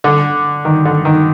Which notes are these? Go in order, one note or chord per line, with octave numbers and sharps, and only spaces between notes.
D3
D#3
D3
D#3